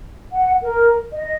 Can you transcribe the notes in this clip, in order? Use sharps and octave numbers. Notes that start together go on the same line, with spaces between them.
F#5
A#4
D#5